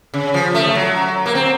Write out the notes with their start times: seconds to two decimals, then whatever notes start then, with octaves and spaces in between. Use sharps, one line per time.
0.14 C#3
0.34 F3
0.55 A3
0.75 F#3
1.26 A#3
1.35 C4